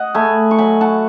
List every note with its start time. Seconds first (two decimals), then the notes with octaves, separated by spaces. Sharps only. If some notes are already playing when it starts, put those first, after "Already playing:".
Already playing: D#5 F#5
0.15 A3 G#5 B5
0.51 C#6
0.58 F#3 G#5 B5
0.81 F#5 A5